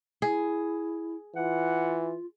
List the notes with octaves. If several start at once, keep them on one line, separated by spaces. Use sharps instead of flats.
E4 G#4
E3 F4 F#5